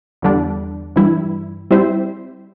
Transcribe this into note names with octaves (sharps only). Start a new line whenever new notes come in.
E2 D3 G3 D4
G2 E3 G3 E4
G3 C4 E4 C5 E5